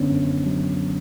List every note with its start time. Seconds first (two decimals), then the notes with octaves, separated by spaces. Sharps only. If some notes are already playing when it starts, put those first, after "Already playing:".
Already playing: F#2 D3 B3 C#4 D4
0.11 F#2
0.46 F#3